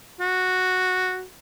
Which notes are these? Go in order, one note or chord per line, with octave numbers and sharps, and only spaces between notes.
F#4